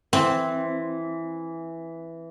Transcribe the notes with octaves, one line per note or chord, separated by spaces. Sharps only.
E3 C4